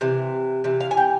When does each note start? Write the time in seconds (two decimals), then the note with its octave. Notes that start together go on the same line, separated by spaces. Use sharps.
0.01 C3 E3
0.64 C3 E3
0.80 F5
0.91 G#5
0.97 G5